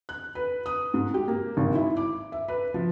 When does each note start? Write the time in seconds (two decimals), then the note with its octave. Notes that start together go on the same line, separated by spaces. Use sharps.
0.09 F#6
0.35 B4
0.66 D#6
0.94 G#2
1.14 G4
1.28 A#3
1.57 G#1
1.75 E4
1.97 D6
2.32 E5
2.48 B4
2.74 F3